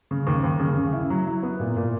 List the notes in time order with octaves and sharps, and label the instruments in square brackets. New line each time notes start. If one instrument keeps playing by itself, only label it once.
[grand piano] C#3
D#2
D#2
C#3
C#3
E4
F#3
E4
B3
A#2
A#2